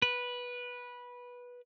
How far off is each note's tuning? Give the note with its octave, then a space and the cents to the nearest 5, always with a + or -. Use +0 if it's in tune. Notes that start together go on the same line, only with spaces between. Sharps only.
B4 -15